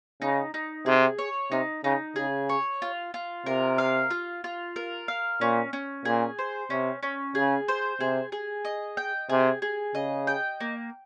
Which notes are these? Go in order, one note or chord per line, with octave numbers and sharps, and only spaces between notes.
C#3 D#4
D#4
C3 G#4
C#5
C3 D#4
C#3 D#4
C#3 G#4
C#5
F4
F4
C3 A#4
F5
F4
F4
A#4
F5
A#2 C#4
C#4
A#2 G#4
C5
C3 C#4
C#4
C#3 G#4
C5
C3 G#4
G#4
D#5
G5
C3 G#4
G#4
C#3 D#5
G5
A#3